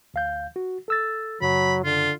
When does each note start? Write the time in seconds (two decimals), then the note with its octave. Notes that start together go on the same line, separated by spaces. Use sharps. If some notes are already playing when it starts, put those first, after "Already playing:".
0.14 D2 F5 G6
0.56 F#4
0.88 A4 E6 A6
1.42 F#2 C#3 F#3 B5
1.85 D3 F4